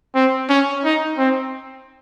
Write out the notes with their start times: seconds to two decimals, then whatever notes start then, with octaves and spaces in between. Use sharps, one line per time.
0.15 C4
0.49 C#4
0.85 D#4
1.18 C4